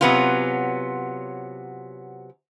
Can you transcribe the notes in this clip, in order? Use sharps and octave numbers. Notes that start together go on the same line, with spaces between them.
C3 F#3 B3 C#4 F4